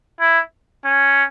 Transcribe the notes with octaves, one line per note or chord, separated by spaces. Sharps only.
E4
C#4